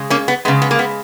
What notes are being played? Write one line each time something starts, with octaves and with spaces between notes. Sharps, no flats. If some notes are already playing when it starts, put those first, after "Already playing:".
Already playing: C#3 G#3
A#3 C#4
B3
C#3 G#3 B3
B3
A#3
B3